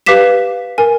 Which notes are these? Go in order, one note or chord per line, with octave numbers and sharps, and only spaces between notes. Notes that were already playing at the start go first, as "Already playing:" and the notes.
G4 B4 F5 D6 B6 E7
A#4 G#5